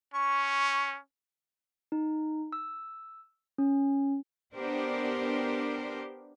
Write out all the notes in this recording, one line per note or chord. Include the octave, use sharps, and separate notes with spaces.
C#4 C#6
D#4
E6
C#4
B3 D4 G4 A#4 C5